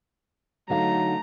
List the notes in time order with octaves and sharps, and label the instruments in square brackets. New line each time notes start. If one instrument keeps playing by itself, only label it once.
[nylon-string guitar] D3 D#4 F5 [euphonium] F#3 [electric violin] A3 A#5